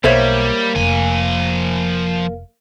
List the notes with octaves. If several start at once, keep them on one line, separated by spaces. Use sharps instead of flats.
B1 G3 A#3 C5 C#5 E5
F1 F3 G#5